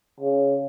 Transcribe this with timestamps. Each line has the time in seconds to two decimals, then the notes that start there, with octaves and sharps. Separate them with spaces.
0.21 C#3